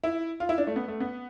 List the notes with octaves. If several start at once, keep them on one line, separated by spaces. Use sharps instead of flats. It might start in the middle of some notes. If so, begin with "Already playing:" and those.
E4
F4
E4
D4
A3
B3
A3
B3